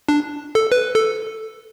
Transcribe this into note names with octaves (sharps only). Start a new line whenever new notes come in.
D4
A4
B4
A4